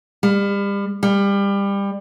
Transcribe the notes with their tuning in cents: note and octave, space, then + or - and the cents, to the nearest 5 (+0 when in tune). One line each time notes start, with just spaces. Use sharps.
G3 +35
G3 +25